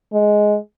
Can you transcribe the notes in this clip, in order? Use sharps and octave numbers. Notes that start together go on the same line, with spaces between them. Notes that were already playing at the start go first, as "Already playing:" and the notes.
G#3